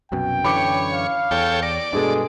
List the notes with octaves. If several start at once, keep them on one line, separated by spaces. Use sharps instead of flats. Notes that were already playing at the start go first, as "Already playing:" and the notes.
C2 F#2 B2 G5
F#2 D3 E3 C#5 B5 D6 C#7
F5
E2 A4 C#5 G5
D5 A#6
G2 B2 G#3 D4 G#4 A4